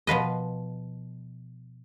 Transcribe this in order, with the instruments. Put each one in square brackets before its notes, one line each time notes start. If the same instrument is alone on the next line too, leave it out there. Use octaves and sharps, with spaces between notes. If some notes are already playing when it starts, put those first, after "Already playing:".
[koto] B2 F3 B4 D#5